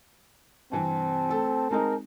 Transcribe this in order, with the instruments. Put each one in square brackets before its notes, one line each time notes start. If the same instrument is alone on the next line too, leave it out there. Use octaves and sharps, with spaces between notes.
[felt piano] G2 C3 E3 [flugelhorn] C4 [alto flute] A5
[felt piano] A3 A4
[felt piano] G#3 C4 D#4 [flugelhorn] A#4